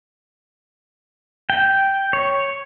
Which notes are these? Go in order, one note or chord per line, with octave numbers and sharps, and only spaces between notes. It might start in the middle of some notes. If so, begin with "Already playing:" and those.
G5
C#5